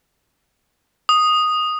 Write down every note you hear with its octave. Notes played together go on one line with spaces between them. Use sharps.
D#6